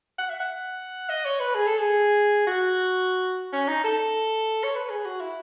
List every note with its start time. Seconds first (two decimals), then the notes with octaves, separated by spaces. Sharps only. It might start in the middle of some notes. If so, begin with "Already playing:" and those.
0.18 F#5
0.29 E5
0.40 F#5
1.09 D#5
1.25 C#5
1.40 B4
1.55 G#4
1.66 A4
1.78 G#4
2.47 F#4
3.53 C#4
3.68 D#4
3.84 A4
4.63 C#5
4.75 B4
4.90 G#4
5.05 F#4
5.20 E4